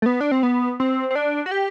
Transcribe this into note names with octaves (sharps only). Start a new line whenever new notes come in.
A3
B3
D4
C4
B3
C4
C4
D4
F#4
G4